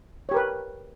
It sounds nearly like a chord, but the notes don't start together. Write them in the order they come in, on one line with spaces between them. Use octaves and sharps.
C#5 G4 A#4 B4